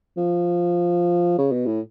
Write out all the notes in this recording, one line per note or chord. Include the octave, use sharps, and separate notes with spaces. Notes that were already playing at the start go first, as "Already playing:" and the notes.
F3
C#3
B2
A2